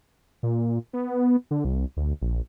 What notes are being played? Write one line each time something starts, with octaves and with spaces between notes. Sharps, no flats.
A#2
B3
D3
C2
D2
A#1